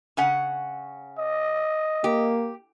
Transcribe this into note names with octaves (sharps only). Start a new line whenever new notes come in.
C#3 C#4 F#5
D#5
A#3 G4